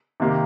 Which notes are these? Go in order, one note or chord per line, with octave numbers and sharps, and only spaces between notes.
C3 D#3 A#3 G4